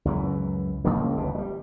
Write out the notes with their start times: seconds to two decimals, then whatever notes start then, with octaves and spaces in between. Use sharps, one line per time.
0.05 C#2 F#2 E3
0.85 C#2 C#3 F3 A#3
1.17 G1 D2 B2
1.35 F#3 G3